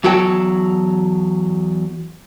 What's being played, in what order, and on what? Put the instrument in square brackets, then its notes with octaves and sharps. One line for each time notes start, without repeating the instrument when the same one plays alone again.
[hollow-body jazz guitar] E2 F#3 F#4 A4 G5